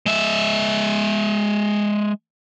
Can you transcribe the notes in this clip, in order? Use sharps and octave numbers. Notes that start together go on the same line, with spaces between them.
G#3 E5